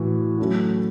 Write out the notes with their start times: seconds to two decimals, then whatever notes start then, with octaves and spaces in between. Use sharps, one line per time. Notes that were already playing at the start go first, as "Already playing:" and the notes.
Already playing: A2 E3 F#4
0.38 F#3 A3 C#4 F#4